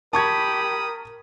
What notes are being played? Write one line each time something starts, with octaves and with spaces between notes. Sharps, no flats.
G4 A#4 A5 B5 C#6 D#6 G#6